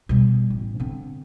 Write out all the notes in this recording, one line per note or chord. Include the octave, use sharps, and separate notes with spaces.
B2 G3
A1
D3 C4